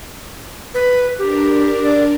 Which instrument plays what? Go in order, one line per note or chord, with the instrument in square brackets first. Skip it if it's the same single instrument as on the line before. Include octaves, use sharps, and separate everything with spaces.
[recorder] B4
[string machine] D4 A#4 [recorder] G4
[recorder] D5